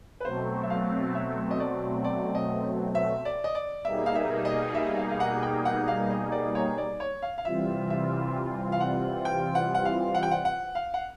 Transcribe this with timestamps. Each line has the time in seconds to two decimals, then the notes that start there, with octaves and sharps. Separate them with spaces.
0.20 B4
0.25 B2 F#3 A3 C4 C5
0.63 E5
0.70 F5
1.15 E5
1.51 D#5
1.60 D5
2.04 D5
2.35 D#5
2.95 E5
3.25 D5
3.44 D#5
3.55 D5
3.85 B2 G3 A#3 D#4 G#4 E5
4.06 F5
4.15 E5
4.45 D#5
4.75 E5
4.97 F5
5.11 F5
5.20 F#5
5.43 G5
5.65 F#5
5.88 F5
6.10 D#5
6.32 D5
6.55 C#5
6.78 D5
7.00 C#5
7.22 F5
7.38 F5
7.45 C3 E3 G3 C4 F4 E5
7.90 E5
8.72 F5
8.80 F#5
9.25 G5
9.55 F#5
9.75 F#5
9.85 F5
10.15 F#5
10.23 G5
10.31 F#5
10.45 F#5
10.75 F5
10.94 F#5